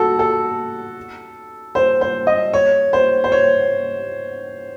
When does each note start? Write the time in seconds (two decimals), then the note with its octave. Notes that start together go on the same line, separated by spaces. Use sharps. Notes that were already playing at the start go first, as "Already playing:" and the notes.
Already playing: F#4 A4
0.19 A4
1.75 C5
2.01 C5
2.27 D#5
2.54 C#5
2.93 C5
3.24 C5
3.32 C#5